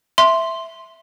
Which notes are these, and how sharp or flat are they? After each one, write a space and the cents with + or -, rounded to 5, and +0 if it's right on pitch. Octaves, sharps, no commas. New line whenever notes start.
E5 +0 C6 +0